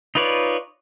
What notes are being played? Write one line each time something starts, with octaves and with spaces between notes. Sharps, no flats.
D#4 F4 B4 C#5 D5